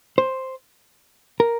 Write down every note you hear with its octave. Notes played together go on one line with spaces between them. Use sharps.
C5
A#4